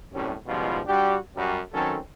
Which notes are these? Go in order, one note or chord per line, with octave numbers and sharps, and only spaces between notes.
C2 F#2 A2 D3 G3 C#4
C#2 B2 F3 G3 D#4 F4
G3 D4 F#4 G4
F#2 G3
D#3 F#3 C4 C#4 A4